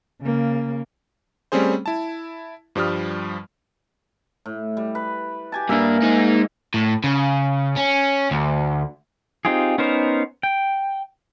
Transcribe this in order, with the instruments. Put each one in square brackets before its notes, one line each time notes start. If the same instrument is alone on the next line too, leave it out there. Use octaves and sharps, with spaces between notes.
[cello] C#3 A#3
[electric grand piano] G3 A3 C4 C#4 G#4 C5
E4 A5
G2 F3 G3 D#6 F6
[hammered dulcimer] A2
G3
B4
G4 G#5 A5
[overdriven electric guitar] G2 D4 [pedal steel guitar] A#3 [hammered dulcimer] G#4 A#4 E5
[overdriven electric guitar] G#3 D#4
A2
C#3
C#4
D2
[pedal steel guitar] C4 D#4 F4 G4 G#4
B3 C#4 D#4 A#4 C5
G5